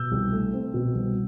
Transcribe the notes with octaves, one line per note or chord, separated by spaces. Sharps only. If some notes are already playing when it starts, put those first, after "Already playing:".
Already playing: B2 E6 G6
C2
A3
C4
B2
C2